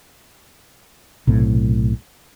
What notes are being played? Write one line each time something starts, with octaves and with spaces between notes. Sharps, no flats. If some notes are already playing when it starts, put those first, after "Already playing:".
B1 A2 C3